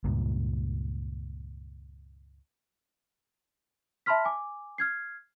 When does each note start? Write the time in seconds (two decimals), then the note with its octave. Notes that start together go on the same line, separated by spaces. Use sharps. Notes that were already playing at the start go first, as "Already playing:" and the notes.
0.04 C#2 G2 A#2
4.06 E5 A5 B5 C6 F6 B6
4.25 G#5 D6
4.78 F6 G#6 C7